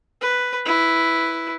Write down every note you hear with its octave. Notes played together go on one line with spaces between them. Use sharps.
B4
E4 B4